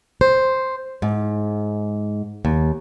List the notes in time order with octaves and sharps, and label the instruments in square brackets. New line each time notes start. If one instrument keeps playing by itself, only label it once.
[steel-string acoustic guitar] C5
G#2
D#2